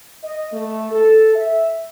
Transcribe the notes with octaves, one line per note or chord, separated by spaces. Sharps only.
D#5
A3
A4
E5